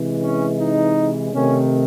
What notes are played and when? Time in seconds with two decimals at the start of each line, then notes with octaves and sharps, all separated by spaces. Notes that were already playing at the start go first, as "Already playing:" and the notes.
Already playing: C3 E3 G#3
0.22 C#4
0.59 D#4
1.33 C3 D#3 A3 C#4